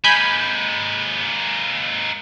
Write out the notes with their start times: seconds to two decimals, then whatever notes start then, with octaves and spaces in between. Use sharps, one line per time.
0.04 G#3 A#3 G#5 B5 G6